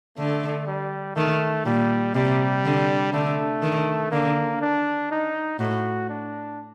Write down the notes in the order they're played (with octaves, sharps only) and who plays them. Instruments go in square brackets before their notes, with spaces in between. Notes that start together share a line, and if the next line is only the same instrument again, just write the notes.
[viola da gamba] D3 [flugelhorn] A3
[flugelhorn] G3
[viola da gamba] D#3 [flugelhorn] A3
[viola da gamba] A#2 [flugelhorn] G3
[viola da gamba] C3 [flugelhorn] G3
[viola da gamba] D3
[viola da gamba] D3 [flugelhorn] A3
[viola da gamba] D#3
[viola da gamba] D3 [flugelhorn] A#3
[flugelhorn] D4
D#4
[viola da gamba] A2 [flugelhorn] F#4
[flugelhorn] D4